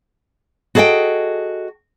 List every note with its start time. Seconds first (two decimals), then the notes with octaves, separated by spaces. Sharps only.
0.75 F#4 G#4 A4 D5 D#5 G5